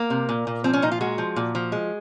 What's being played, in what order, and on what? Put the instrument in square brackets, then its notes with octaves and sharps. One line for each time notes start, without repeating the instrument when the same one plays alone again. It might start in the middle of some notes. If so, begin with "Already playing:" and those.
Already playing: [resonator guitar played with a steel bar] A#3
C3
A#2
A#2
F3 C4
C#4
A#2 D#4
F4
G#3 F#4
F3
A#2
F3
G#3